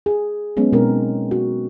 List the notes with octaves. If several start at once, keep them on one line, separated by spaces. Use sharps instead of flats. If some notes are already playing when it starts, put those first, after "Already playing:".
G#4
F#3 G#3 B3 C#4
B2 G#3 C4 D#4 A#4
F#4